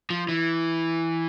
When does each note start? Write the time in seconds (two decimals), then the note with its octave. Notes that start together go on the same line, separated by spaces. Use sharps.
0.10 F3
0.29 E3